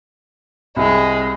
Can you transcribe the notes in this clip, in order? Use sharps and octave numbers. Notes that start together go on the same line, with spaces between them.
C2 G#3